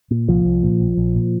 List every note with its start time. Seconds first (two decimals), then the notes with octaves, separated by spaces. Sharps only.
0.11 A#2
0.28 C2 F3
0.45 C2
0.63 A#2
0.80 A#1
0.97 A#1
1.15 A#2